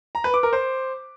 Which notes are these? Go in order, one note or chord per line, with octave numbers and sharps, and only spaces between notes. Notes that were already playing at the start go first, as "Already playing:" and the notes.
A#5
B4
D6
A#4
C5